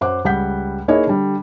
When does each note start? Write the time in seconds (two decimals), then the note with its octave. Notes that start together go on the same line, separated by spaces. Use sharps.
0.01 F#2 C5 F#5 D6 F#6
0.25 C#2 G3 F#5 G6 B6
0.88 A#3 D#4 E4 G#4 C#5 D#5
1.07 D3 G3